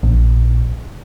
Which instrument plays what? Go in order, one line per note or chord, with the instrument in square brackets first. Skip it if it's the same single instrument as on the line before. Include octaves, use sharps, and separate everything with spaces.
[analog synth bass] A#1